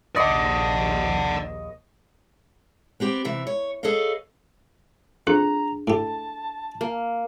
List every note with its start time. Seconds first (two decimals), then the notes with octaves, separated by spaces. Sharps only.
0.16 A#1 D#2 D5 D#5 F#5 C#6 D6
3.00 B3 C4 G4
3.25 C3 E3 E5
3.47 C#5
3.83 G#4 A4 B4 C#5 D#5 F5
5.27 F2 D4 G#4 A#5
5.87 A2 G4 A5
6.81 A#3